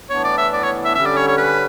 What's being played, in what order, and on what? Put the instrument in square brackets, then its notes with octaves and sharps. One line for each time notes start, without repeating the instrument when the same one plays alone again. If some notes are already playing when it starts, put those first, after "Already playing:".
[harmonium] A2 E3 B3 D4 [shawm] C#5
[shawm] D5
E5
D5
C#5
E5
[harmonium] D3 G3 C#4 [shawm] E5
[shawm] D5
C#5
C#5
B4